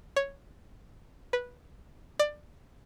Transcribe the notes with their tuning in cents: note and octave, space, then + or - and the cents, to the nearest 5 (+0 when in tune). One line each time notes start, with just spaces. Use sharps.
C#5 +0
B4 -10
D5 +20